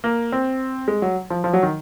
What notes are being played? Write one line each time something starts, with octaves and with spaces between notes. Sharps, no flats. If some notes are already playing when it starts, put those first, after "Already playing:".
A#3
C4
G#3
F#3
F3
F3
F#3
D#3